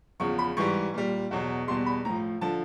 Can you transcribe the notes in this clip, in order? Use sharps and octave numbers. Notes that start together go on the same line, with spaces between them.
E2 C#3 F3 C#6
B5
G#2 E3 G3 C#6
A#2 G3
E2 B2 F#3
E2 B2 G3 C6
B5
A2 F3 A#5
D3 F3 A5